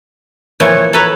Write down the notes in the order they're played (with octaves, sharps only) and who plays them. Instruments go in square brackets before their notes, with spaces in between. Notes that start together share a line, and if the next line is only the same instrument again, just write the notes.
[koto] A#2 E3 F3 [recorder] C#5
[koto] A4 B4 C#5 [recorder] A#5